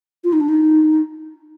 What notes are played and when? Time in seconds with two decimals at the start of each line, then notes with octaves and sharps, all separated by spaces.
0.24 F4
0.32 D#4
0.40 D4
0.48 D#4